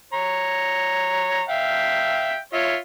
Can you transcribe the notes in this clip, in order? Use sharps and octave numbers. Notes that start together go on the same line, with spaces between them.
C#5 A#5
E5 F5 G5
F4 C#5 E5